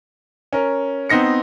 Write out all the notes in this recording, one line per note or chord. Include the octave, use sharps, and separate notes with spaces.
C#4 A#4
B3 C4 D#4 A#6 C#7